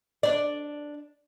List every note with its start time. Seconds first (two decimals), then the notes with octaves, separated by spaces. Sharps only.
0.23 D4 D5